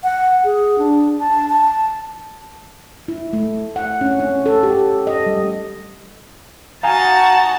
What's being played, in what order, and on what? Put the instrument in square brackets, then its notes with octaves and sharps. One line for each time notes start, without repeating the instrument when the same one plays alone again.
[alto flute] F#5
G#4
D4
A5
A5
[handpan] E4
A3
F#5
C#4
C#4
A4
G4
D#5
G3
[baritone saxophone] D#4 [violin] F#4 A5 [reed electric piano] F5 G#5